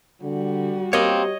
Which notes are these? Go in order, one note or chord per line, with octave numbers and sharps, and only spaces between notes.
D3 G3 F#4
A#3 C4 G4 C#5 D#5